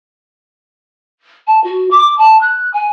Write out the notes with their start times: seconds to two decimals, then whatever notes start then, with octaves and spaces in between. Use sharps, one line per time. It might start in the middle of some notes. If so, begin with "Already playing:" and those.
1.47 A5
1.64 F#4
1.91 D6
2.18 A5
2.41 F#6
2.74 G#5